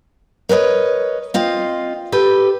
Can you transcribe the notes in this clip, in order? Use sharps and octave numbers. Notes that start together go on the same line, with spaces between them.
A#4 B4 C#5 D#5
C4 F4 D#5
G4 A4 B4